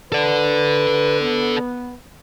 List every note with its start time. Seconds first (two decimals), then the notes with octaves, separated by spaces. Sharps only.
0.12 A4 B4 D5
1.21 B3